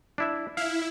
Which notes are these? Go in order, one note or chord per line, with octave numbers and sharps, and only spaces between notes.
D4 E4 E5
E4 F5